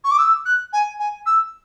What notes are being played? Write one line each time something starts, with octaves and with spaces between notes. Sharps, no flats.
C#6
D6
E6
F#6
G#5
G#5
E6